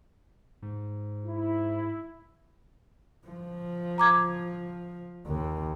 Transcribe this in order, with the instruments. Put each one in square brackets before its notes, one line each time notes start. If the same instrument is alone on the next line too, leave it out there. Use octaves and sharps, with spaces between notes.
[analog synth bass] G#2
[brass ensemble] E4
[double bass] F3
[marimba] A#5 D6 G#6
[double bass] D#2